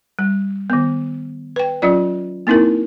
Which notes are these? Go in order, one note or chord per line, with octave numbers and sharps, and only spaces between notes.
G3
D#3 B3
B4 G5
F#3 C#4 F4 D5
A#3 C4 D#4 E4 A#4